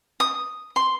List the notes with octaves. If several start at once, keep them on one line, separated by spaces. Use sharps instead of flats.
D#6
C6